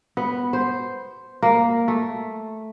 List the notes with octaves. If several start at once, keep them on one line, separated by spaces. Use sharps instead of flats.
B3
C5
A#3
A3